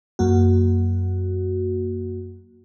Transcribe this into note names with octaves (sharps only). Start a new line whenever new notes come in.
F#2 A#3 F#4